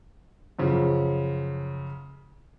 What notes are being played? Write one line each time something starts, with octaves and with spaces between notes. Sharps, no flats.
F#2 C#3 F3